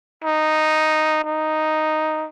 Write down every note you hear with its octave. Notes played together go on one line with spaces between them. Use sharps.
D#4
D#4